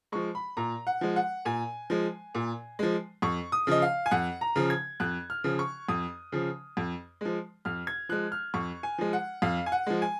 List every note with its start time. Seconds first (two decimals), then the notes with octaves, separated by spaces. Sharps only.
0.12 F3 G#3 C#6
0.35 B5
0.57 A#2 A#5
0.87 F#5
1.01 F3 G#3
1.16 F#5
1.45 A#2 G#5
1.90 F3 G#3
2.35 A#2
2.79 F3 G#3
3.22 F2 C#6
3.52 D#6
3.67 C#3 F3 D#5
3.82 F5
4.06 G#5
4.11 F2 F#5
4.41 A#5
4.56 C#3 F3
4.70 G#6
5.00 F2 F#6
5.30 F6
5.44 C#3 F3
5.59 C#6
5.89 F2 D#6
6.32 C#3 F3
6.77 F2
7.21 F3 G#3
7.65 F2 F6
7.87 G#6
8.09 F3 G#3 F#6
8.32 F6
8.54 F2 C#6
8.83 G#5
8.98 F3 G#3
9.13 F#5
9.42 F2 F5
9.66 G#5
9.72 F#5
9.87 F3 G#3
10.02 G#5